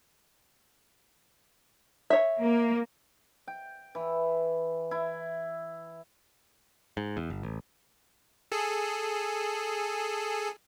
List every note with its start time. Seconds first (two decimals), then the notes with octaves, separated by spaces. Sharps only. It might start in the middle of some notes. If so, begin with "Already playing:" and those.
2.10 C#5 E5
2.41 A#3
3.48 G5
3.95 E3
4.91 E4
6.97 G#2
7.17 E2
7.30 G1
7.43 A1
8.52 G#4 A4